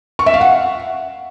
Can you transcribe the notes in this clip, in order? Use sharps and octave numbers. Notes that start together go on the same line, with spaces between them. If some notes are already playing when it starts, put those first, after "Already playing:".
C#6
E5
F5
F#5